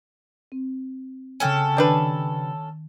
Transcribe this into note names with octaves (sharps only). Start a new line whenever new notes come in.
C4
C#3 C#4 A4 G5 G#5 G#6
D#3 G3 D4 B4